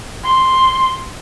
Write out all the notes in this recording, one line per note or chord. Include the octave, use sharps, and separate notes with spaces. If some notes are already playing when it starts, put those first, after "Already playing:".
C6